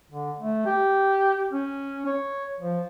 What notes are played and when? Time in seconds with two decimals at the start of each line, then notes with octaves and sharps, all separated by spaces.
0.11 D3
0.40 A3
0.66 G4
1.52 C#4
2.06 C#5
2.60 F3